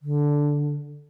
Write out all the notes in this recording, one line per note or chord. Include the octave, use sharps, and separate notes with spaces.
D3